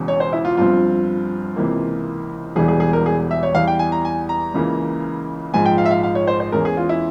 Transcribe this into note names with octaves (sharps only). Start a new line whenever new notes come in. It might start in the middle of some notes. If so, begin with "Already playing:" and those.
Already playing: E1 E2 C#3
C#5
C5
E4
F4
G1 G2 F3 C4 F4
C#2 C3 E3 A#3
E1 E2 E3 G3 G#4
G#4
G#4
A#4
G#4
E5
C#5
E2 E3 G3 F5
G5
G#5
A#5
G#5
A#5
C#2 C#3 E3 A#3
A#1 G#2 F3 G#3 G#5
G5
F5
E5
F5
F5
C#5
C5
C5
E2 E3 G#3 C#4 A#4
G#4
F4
E4